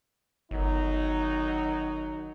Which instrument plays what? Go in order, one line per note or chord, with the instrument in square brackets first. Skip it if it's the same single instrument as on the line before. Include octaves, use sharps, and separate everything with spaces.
[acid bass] G1 [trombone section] D#3 F#3 D#4